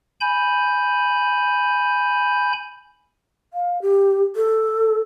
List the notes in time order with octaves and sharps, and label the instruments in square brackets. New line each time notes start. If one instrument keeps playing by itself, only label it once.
[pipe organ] G#5 B5 G6
[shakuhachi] F5
G4
A4